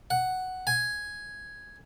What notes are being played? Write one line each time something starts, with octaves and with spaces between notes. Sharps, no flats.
F#5
G#5